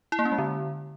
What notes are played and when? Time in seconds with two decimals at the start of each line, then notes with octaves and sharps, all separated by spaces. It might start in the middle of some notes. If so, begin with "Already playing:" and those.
0.12 E4
0.19 A#3
0.25 C#4
0.32 G#3
0.38 D3